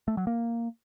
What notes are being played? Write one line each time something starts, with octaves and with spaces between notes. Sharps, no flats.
A3
F#3
A#3